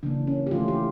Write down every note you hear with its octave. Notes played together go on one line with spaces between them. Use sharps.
C#3 E3 A#3 D4
C#4
G4
E3 A3 F4
G4